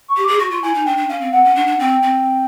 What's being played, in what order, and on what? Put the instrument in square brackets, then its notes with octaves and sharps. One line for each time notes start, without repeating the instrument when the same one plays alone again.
[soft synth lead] C#6
[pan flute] G4
[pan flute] G#4 [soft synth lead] D6
[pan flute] F#4 [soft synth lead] C#6
[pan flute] F4
[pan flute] E4 [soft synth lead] G#5
[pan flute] D#4
[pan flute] D4 [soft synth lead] G5
[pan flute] D4
[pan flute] C#4 [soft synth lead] F5
[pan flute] C4
[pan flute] C4 [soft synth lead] F#5
[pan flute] C#4
[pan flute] D4 [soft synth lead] F#5
[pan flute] D4
[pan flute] C4 [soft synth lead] G5
[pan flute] C4